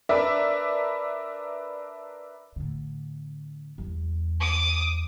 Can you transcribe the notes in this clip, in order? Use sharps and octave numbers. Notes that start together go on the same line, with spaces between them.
D4 A#4 B4 D5 E5
A2 D3
E2 G3
D6 D#6